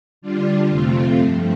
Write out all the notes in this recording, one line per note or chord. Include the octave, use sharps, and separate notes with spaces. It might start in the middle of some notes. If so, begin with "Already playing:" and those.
D3 G3 D4 F4
F2 C3 A3 C4 F4
G2 F3 A3